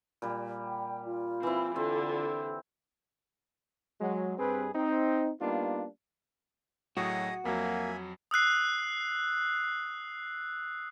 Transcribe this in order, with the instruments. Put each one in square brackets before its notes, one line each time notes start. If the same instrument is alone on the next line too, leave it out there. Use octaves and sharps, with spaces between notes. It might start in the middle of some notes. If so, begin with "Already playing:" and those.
[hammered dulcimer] A#2 G3
[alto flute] G5
F4
[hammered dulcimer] E3 E4 [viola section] C4
[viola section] D3 [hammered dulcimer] C4 [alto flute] F4
[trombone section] F#3 G#3
G2 G3 C4 G#4 B4
C4 D#4
G3 A#3 B3 D4 D#4 F4
[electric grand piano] A2 F#3 [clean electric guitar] F#4 [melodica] G#4 D#5 D#6
[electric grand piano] F2 F#3 [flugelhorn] A#3 [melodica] E5 G#5
[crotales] D#6 E6 F#6 C7